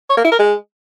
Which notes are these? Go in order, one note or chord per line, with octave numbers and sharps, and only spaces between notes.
C#5
A#3
E4
A#4
G#3